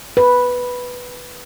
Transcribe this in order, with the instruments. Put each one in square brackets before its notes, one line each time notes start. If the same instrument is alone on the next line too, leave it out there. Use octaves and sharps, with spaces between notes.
[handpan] B4